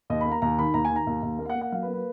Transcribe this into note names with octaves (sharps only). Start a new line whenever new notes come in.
D#2 D#5
A#3 B5
A#5
D#2 A#5
D#3 B5
D#2 A#5
G#5
D#3
A#5
D#2
D#2
A#3
F5
F#5
A#3
F#5
F#3 F5
B4
A#3
B4